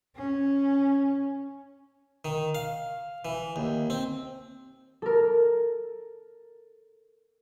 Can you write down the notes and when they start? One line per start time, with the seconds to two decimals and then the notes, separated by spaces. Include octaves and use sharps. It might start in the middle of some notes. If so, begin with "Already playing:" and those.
0.16 C#4
2.25 D#3
2.55 F5
3.25 E3
3.56 D#2
3.90 C4
5.02 A4 A#4